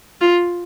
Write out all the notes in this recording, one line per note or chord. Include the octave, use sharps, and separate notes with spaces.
F4